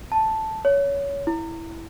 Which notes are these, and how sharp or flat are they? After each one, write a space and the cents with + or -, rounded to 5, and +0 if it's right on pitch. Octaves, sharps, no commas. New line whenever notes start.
A5 +0
C#5 +20
E4 +0